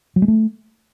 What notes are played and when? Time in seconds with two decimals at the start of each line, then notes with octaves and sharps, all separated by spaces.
0.16 F#3
0.22 G#3
0.28 A3